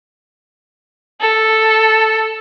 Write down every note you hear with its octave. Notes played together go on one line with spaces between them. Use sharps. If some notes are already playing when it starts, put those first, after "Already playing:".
A4